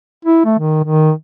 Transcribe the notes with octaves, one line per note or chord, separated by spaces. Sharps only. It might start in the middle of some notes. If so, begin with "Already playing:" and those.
E4
A3
D#3
D#3